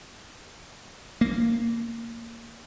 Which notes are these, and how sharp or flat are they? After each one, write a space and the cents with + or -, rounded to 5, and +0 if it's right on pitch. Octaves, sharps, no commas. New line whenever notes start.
A#3 -15